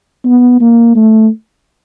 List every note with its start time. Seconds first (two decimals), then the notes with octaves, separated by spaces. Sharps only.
0.25 B3
0.61 A#3
0.96 A3